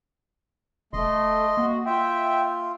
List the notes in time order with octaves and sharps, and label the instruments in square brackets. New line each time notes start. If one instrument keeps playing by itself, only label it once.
[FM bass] E1 [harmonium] A3 [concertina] D#5 C6
[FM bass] A#3 [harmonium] F#4
[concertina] F4 [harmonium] E5 G5